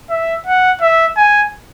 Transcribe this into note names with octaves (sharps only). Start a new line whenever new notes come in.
E5
F#5
E5
G#5